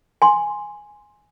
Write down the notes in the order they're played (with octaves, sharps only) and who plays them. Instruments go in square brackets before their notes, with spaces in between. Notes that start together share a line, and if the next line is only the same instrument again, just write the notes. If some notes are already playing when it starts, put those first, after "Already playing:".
[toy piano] G#5 C6